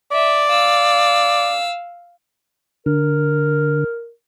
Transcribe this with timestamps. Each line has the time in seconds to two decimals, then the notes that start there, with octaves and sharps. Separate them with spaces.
0.12 D5 E5
0.49 F5 E6
2.86 D3 A#4